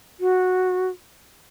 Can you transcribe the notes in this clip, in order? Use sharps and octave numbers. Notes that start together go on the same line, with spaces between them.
F#4